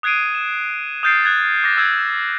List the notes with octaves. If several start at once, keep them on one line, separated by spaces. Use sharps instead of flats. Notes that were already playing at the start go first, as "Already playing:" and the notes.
D#6 F#6 G#6 C7 D7 D#7
E7
D#6 F6 G6 A6 C7 D7
F#6 G#6 A6
D6 A6 A#6 C7
D#6 E6 G6 G#6 D7